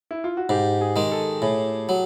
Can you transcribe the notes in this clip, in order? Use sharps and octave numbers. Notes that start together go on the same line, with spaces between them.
E4
F4
F#4
G#2 G4
G#4
D#3 G#3
A4
A2 G#4
F#3